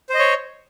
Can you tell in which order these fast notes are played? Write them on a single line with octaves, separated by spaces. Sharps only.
C5 D#5 C#5